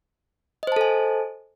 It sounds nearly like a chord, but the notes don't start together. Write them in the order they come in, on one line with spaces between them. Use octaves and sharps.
D#5 C5 A5 A4 G#5